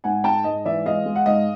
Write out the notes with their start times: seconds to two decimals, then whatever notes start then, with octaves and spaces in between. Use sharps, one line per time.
0.04 G#2 F#5 G#5
0.24 G#3 G5 A5
0.44 G#2 D#5
0.65 E3 D5 E5
0.86 G#3 D#5 F5
1.06 G#3
1.16 F#5
1.26 G#2 D#5 F5